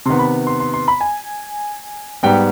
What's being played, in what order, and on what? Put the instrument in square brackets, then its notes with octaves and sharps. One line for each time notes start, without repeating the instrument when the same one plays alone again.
[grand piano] C3 D#3 B3 C6
B5
C6
C6
C6
B5
G#5
G#2 G3 B3 G5